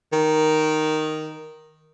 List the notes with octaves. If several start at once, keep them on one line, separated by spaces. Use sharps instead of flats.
D#3